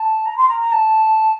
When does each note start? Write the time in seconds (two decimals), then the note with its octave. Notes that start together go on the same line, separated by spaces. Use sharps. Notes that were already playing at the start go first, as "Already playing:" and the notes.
Already playing: A5
0.25 A#5
0.37 C6
0.48 A#5
0.60 A#5
0.72 A5